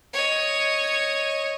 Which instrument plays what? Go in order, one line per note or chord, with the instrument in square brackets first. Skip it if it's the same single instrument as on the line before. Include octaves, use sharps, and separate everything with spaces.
[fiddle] C#5 D#5